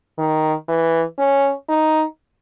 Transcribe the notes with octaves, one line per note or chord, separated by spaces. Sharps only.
D#3
E3
C#4
D#4